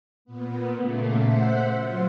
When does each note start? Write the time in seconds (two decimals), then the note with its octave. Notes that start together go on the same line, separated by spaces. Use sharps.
0.25 A#2 B3
0.75 A#2 C#3 A3 A#3
1.20 C5 E5 F#5
1.74 F#3 F4